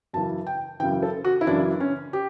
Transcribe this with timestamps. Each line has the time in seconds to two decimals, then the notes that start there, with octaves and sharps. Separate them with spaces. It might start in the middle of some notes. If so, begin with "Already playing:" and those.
0.13 F#2 C#3 E3 A5
0.47 G5
0.80 F#2 C#3 E3 G5
1.03 A4
1.25 F#4
1.41 E4
1.47 F#2 C#3 E3 D4
1.80 C#4
2.13 G4